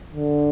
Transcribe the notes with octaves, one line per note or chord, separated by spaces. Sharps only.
D3